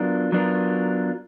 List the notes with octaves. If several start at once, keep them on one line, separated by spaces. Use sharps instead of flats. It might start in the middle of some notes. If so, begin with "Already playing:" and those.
Already playing: F#3 B3 D4 F4 A#4
F#3 B3 D4 F4 A#4